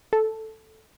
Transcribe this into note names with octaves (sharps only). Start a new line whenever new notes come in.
A4